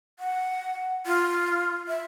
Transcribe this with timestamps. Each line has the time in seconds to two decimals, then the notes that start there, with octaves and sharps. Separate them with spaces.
0.19 F#5
1.06 F4
1.88 E5